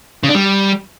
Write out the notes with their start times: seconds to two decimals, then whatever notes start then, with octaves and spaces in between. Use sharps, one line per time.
0.23 C#3
0.29 D4
0.35 G3